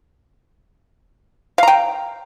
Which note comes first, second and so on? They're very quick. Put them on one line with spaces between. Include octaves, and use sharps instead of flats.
F5 A#5 G5